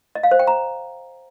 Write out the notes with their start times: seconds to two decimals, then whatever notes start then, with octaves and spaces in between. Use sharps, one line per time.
0.15 D#5
0.23 F5
0.31 C5
0.39 G5
0.47 A#5